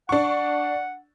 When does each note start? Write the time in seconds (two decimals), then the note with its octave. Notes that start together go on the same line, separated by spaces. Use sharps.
0.09 D4 F#5 C#6